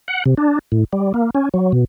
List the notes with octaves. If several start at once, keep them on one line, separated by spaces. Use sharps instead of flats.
F#5
C3
D4
A2
G3
A#3
C#4
F#3
B2